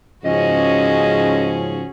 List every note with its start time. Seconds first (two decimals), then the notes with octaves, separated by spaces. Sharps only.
0.25 G#2 C#3 F3 C#4 F#4 G#4 D#5